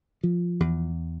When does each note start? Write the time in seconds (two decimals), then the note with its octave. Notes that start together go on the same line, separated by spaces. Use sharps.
0.24 F3
0.60 E2